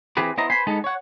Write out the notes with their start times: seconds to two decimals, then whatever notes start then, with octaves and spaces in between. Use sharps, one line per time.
0.17 E3 C4 G4 G#4 B4
0.37 B3 E4 C5 D#5 A#5
0.50 B4 C5 G#5 B5 C6
0.67 G#3 B3 D#4 A4
0.84 C#5 F#5